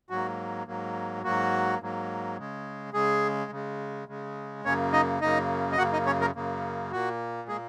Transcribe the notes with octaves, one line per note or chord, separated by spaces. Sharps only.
G#2 F#3 A#3 F#4
G#2 F#3 A#3
G#2 F#3 A#3 F#4
G#2 F#3 A#3
C#3 G#3
C#3 G#3 G#4
C#3 G#3
C#3 G#3
F#2 C#3 A#3 C#4 C#5
D#4 D#5
F#2 C#3 A#3 D#4 D#5
D#5
F#2 C#3 A#3 F#4 F#5
D#4 D#5
C#4 C#5
A#3 A#4
F#2 C#3 A#3
A#2 A#3 F#4
A#2 G#3 A#3 G#4